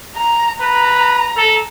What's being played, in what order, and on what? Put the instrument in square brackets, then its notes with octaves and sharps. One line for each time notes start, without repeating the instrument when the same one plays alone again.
[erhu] A#5
[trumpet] B4 [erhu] A#5
[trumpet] A4